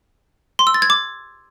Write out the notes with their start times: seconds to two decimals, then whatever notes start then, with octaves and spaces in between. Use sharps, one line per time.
0.59 C6
0.67 E6
0.74 A6
0.82 G#6
0.90 D6